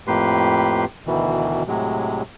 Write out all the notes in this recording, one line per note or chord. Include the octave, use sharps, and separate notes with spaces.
F2 A2 A#3 G4 B4 C6
D2 B2 D#3 E3
A2 C3 F#3 G#3